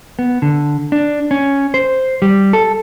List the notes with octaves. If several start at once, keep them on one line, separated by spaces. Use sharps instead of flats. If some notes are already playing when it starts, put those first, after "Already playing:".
B3
D3
D4
C#4
C5
G3
A4